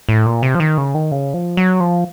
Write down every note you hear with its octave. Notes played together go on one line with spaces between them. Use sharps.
A2
A#2
C3
F3
D#3
C#3
D#3
C#3
F3
F#3
F3